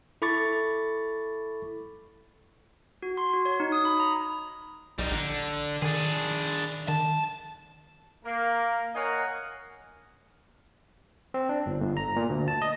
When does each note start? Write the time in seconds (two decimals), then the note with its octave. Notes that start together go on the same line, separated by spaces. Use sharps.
0.22 E4 A4 B5 C#6 D6 A6
3.02 F#4
3.17 C6
3.33 F#4
3.45 C#5
3.60 D#4
3.72 D#6
3.85 B5
4.00 A#5
4.99 B1 G3 D#4
5.11 A#1 D3
5.82 D#3 D4 G#4
6.88 D#3 A5
8.25 A#3 A#4
8.95 A#4 C#5 D#5 F5 F#5 G#5
11.34 C4
11.49 D4
11.66 G1
11.80 G1
11.97 A#5
12.16 A#2
12.29 D2
12.48 A5
12.62 D#5